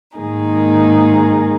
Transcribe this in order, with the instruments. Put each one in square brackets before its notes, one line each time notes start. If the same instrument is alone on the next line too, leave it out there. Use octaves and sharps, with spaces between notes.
[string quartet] G#2 D#3 A#3 D#4 G#4